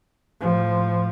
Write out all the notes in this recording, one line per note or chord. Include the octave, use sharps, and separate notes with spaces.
A2 F3